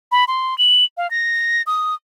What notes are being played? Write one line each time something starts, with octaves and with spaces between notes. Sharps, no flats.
B5
C6
F#7
F5
A#6
D#6